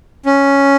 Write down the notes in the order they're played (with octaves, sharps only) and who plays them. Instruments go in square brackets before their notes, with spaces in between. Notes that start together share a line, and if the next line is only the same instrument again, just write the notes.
[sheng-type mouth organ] C#4